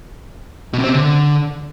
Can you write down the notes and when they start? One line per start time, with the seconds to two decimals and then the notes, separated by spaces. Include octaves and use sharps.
0.73 B2
0.79 C3
0.84 C4
0.89 C3
0.94 D3